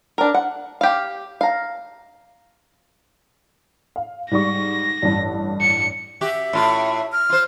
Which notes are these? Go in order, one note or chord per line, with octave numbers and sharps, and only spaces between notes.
D4 A#4
F#5
G4 F5
F5 A#5
F5
G#2 G3 C#6 A#6
A1 G2
C#7
F#4 G4 E5
A2 F4 F#4
F6
F4 C5